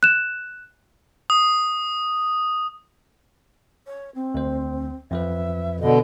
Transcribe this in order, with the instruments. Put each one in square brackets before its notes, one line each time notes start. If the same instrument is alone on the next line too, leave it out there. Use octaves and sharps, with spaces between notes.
[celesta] F#6 E7
[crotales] D#6
[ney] C#5
C4
[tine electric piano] D2 C5
[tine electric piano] F2 F3 B4 [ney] E5
[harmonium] B2 D3 [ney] D#5